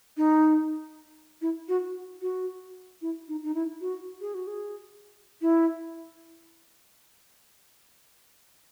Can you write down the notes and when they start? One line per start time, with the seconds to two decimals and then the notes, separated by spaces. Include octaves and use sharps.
0.17 D#4
1.42 E4
1.69 F#4
2.22 F#4
3.02 E4
3.28 D#4
3.43 D#4
3.54 E4
3.81 F#4
4.21 G#4
4.34 F#4
4.47 G#4
5.42 E4